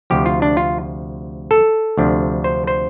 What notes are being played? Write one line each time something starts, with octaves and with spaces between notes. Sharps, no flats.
D2 C3 F3 G4
F4
D4
F4
A4
D2 C3 F3 D4
C5
C5